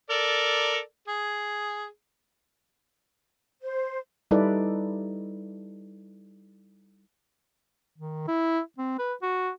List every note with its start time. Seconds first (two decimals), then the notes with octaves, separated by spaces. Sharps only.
0.10 A4 A#4 D5
1.08 G#4
3.62 C5
4.31 G3 D#4 E4 A4 B4 D5
7.98 D#3
8.28 E4
8.78 C4
8.99 B4
9.22 F#4